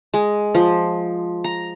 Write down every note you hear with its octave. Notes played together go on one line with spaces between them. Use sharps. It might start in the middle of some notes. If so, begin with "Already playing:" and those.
G#3
F3
A#5